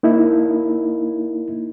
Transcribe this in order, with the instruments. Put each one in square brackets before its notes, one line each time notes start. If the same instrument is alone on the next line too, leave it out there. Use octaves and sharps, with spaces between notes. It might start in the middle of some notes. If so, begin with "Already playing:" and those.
[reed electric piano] A#3 D#4 E4